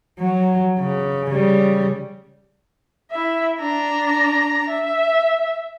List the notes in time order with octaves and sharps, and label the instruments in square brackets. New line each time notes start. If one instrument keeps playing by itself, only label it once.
[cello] F#3
C#3
C#3 G3
[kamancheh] E4 E5
D4 A#5
E5